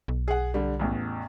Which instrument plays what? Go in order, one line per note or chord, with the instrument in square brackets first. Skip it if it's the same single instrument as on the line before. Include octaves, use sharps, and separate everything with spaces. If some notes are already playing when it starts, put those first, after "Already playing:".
[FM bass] B1
[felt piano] G#4 F#5
D3 G3
A1 E2